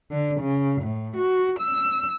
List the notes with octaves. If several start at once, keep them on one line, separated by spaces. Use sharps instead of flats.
D3
C#3
A2
F#4
E6